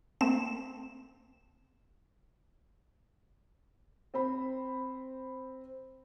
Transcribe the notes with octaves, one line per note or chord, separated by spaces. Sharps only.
A3 A#3 C4 E7
C4 C5 B5